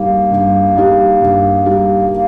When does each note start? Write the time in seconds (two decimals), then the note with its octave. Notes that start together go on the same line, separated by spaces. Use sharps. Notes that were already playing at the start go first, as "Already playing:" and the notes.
Already playing: G2 G3 A#3 D#4 G4
0.31 G2
0.76 G3 D#4 G4
1.21 G2
1.66 G3 D#4 G4
2.11 A#3